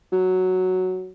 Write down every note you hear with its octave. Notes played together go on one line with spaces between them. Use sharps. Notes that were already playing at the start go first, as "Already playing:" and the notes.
F#3